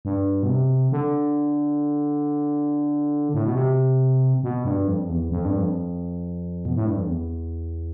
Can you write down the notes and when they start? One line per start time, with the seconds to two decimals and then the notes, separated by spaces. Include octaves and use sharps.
0.05 G2
0.43 B2
0.49 C3
0.92 D3
3.34 A2
3.45 B2
3.55 C3
4.43 B2
4.65 G2
4.87 F2
5.09 E2
5.31 F2
5.45 G2
5.58 F2
6.65 B2
6.76 A2
6.86 G2
6.96 F2
7.06 E2